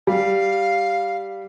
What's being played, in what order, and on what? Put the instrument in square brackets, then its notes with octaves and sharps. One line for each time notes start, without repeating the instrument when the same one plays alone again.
[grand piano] G3 [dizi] F5